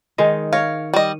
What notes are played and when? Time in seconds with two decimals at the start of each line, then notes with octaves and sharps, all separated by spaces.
0.18 D#3 G#3 D#4
0.53 A#4 C#5 F5
0.94 G3 D#5